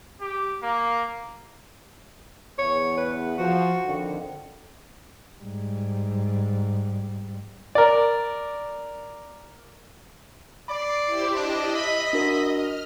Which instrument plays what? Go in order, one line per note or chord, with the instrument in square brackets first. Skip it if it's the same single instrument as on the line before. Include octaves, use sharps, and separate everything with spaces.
[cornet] G4
A#3
[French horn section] E2 [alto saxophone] C#5
[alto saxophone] B4
[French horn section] F3 [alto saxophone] F#4
[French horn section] F2 D3 D#3
[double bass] G#2 G3
[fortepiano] A#4 D5
[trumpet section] D5 [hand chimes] B5 [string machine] C7
[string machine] E4 G4 C5
[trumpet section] D4 [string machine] D#5
[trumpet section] E5 B5
[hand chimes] D4 F#4 A#4
[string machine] F6